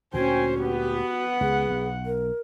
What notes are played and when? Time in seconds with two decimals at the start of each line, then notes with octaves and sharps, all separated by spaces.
0.14 D2 A#2 C#4 F#4 C5 G5 G#5
0.60 B3 G4
1.00 F#5
1.41 C#2 G#4
1.70 B1
2.06 A#4